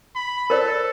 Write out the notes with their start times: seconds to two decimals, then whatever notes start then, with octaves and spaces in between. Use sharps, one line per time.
0.15 B5
0.50 A4 A#4 C5 D5